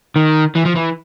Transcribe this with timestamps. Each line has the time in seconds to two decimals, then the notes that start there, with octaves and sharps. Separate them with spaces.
0.16 D#3
0.56 E3
0.66 F3
0.76 E3